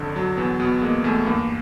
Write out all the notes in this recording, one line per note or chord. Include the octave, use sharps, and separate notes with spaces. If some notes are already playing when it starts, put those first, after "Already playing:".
Already playing: G1 F2 D3
F#3
E2 B3
B2 B3
G#3 A#3
E2 A3
G2 A#3